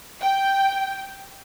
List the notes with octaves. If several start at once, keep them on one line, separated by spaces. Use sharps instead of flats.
G5